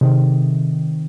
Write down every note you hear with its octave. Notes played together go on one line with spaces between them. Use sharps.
C3 D#3